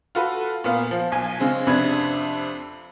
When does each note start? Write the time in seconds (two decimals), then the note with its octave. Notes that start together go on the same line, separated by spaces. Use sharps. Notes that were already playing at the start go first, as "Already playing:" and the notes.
0.15 F4 F#4 A4 B4
0.64 A#2 B3 F5
0.91 F3
1.12 B1 G#5
1.40 C#3 G#3 C4
1.67 F2 C3 D4 B4 G#6